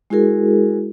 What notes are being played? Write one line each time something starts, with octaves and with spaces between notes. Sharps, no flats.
G#3 E4 F#4 G#4 A#4